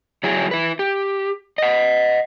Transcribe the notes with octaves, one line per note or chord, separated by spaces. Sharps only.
F#3 E4 G#4
E4 B4
G4
D#5 F#5